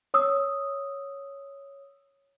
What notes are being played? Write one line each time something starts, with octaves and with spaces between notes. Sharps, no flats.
C#5 D#6 E6